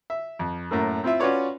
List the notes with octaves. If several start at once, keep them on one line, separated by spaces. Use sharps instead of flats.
E5
F2
F#2 A2 A3 A#3
C4 E4 F4 E5
C#4 F4 F#4 B4 C#5 D5